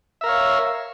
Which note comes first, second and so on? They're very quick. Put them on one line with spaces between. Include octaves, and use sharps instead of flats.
E5 A#4 F5 C#5